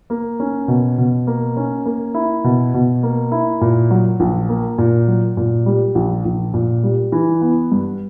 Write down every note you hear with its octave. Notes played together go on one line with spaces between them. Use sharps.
A#3
C#4
B2
B2
A#3
C#4
A#3
E4
B2
B2
A#3
E4
A#2
F#3
A#1
A#3
A#2
F#3
A#2
G3
A#1
A#1
A#2
G3
E3
B3
G2